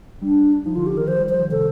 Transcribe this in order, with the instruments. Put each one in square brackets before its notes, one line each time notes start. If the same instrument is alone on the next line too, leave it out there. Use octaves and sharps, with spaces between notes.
[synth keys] G3 [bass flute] D4
[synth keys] F3 [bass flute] D#4
[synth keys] D3 [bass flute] F4
[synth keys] D3 [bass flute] G4
[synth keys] D#3 [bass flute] A#4
[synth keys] F3 [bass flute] C5
[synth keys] G3
[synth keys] F3 [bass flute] C5
[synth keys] D#3
[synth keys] C3 [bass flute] A4